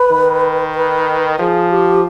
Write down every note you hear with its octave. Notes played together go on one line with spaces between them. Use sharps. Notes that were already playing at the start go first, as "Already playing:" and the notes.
Already playing: B4
D#3
B4
F3 G#4
G4